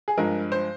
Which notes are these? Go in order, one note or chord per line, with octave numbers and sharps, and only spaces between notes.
G#4
G2 F3 G#3 A#4
C5